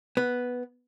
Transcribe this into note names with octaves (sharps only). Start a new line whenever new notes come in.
B3